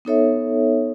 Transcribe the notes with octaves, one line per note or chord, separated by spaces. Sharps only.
B3 D#4 A4 C#5 E5